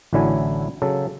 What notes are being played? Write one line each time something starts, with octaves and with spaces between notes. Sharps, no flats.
A1 A2 D3 F#3 E4 G#5
C#3 F#3 A4